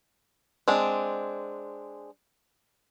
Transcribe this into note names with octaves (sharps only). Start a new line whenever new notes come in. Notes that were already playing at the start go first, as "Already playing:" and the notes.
G#3 C4 D4